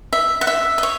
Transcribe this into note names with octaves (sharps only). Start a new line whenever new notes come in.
E5
F#5
E5
D#5
C#5